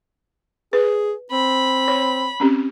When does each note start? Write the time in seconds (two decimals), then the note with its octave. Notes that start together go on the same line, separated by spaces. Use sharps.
0.73 G#4 B4
1.32 C4 B5
1.88 C#5
2.40 C4 C#4 G4